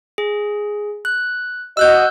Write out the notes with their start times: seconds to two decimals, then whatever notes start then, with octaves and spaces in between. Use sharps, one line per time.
0.18 G#4
1.05 F#6
1.77 F#4 D#5 E6 F#6 G6